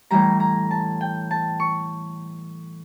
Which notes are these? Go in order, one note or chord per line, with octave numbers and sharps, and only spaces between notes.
A2 E3 G3 A#5
A#5
A5
G5
A5
C#6